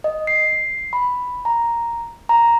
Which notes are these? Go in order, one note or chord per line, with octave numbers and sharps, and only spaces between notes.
D#5
C7
B5
A#5
A#5